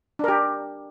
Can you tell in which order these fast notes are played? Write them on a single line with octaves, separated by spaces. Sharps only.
D4 A#4 G4